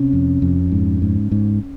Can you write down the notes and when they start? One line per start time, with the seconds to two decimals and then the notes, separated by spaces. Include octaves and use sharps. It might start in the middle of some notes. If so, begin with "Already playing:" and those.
Already playing: C3 C#4
0.13 F2
0.42 F2
0.71 G#2
1.02 G#2
1.31 G#2